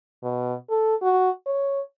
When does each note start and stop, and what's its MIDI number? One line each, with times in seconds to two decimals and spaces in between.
0.23 0.54 47
0.70 0.95 69
1.02 1.30 66
1.46 1.80 73